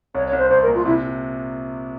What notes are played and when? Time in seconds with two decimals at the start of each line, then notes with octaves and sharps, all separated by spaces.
0.15 C2 C#5
0.27 C#5
0.33 C2
0.39 C5
0.50 C2 C5
0.63 A#4
0.68 A#2
0.74 F4
0.85 C3 E4